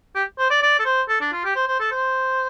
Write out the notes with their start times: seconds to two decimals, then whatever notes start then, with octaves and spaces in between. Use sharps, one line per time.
0.15 G4
0.38 C5
0.50 D5
0.62 D5
0.79 A4
0.85 C5
1.08 A4
1.21 D4
1.32 F4
1.44 G4
1.56 C5
1.68 C5
1.80 A4
1.91 C5